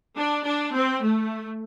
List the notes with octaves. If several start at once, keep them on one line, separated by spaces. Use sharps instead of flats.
D4
D4
C4
A3